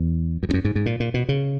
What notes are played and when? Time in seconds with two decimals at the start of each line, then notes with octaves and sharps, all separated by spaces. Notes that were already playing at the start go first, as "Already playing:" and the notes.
Already playing: E2
0.43 F#2
0.49 E2
0.54 F#2
0.65 G#2
0.75 G#2
0.86 A#2
1.00 A#2
1.14 B2
1.29 C#3